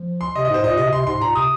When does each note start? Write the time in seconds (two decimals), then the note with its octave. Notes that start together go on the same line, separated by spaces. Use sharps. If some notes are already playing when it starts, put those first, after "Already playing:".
Already playing: F3
0.21 C6
0.34 C3 D#5
0.45 D#5
0.50 G#2 C5
0.63 A#2 D#5
0.77 C3 D#5
0.92 C3 C6
1.06 G#2 C6
1.21 A#2 A#5
1.35 C3 D#6